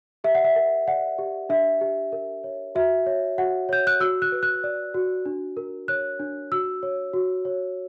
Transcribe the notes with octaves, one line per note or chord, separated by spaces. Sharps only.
G4 E5
F#5
E5
A#4
D5 F#5
G4
D4 E5
G4
A#4
C#5
F#4 E5
C#5
F#4 F#5
C#5 G6
F#6
F#4 E6
F#6
B4
F#6
D5
F#4
D4
A#4
C#5 F#6
D4
F#4 E6
C#5
F#4
C#5